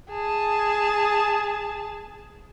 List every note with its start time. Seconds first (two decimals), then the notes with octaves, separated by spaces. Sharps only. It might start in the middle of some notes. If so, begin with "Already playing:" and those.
0.12 G#4 A5